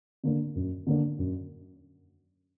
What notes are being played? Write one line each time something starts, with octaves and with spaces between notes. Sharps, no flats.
D3 A#3 D4
F#2
D3 A#3 D4
F#2